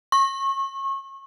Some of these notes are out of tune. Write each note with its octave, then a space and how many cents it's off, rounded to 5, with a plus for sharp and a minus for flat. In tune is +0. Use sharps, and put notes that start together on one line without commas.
C#6 -30